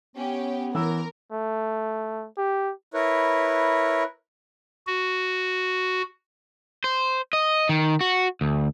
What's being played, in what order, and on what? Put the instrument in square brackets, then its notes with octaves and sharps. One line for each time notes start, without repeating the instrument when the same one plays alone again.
[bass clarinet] B3 [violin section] C#4 G4
[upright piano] E3 E6 [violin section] A#4
[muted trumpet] A3
G4
[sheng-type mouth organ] E4 A#4 B4 C#5
[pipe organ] F#4
[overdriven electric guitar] C5
D#5
D#3
F#4
D2